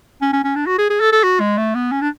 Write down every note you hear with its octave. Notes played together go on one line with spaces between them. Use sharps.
C#4
C#4
C#4
D4
F#4
G#4
G#4
A4
A4
F#4
G#3
A3
B3
C#4
D4